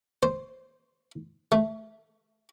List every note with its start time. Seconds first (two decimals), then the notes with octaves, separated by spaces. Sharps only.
0.23 C5
1.52 A3